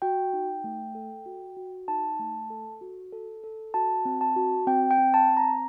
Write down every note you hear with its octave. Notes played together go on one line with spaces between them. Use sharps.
F#4 G5
D#4
A3
A4
F#4
F#4
D#4 A5
A3
A4
F#4
A4
A4
F#4 A5
C4
A5
F#4
C4 G5
G5
C4
A5
C4
A#5